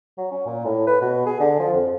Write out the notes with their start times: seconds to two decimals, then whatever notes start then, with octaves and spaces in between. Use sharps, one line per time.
0.18 F#3
0.31 C#4
0.46 A#2
0.65 A2
0.87 B4
1.02 B2
1.26 G#4
1.40 D3
1.60 F3
1.73 F2